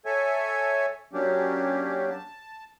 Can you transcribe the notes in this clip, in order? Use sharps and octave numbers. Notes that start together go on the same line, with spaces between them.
A4 C#5 E5 G#5
F#3 A#3 C#4 D4 G4
A5